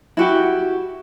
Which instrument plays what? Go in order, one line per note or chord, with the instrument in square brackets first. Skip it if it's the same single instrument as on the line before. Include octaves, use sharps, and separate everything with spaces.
[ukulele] E4 F#4 G4